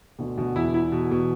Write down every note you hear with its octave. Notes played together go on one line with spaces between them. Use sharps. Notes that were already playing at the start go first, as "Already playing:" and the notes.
D2 B2 D3
D2 B2 D3
E2 E3 E4
E4
B2
B2